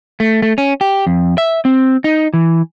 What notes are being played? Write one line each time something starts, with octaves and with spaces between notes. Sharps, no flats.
A3
A3
C#4
G4
F2
E5
C4
D#4
E3